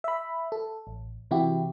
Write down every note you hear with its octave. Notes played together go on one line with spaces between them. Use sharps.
E5 B5
A4
A1
C3 E3 E4 F#4 G4